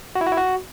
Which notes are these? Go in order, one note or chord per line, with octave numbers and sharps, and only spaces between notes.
F#4
E4
F#4
E4
F#4